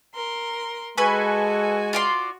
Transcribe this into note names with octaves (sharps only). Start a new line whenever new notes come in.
A#4 C6
G#3 F#4 A4 B4 G#5 C#6
F4 D5 C6